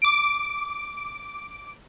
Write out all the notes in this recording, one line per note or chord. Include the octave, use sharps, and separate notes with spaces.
D6 D7